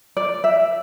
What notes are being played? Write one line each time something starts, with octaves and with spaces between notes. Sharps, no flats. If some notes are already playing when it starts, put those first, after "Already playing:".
D5
E5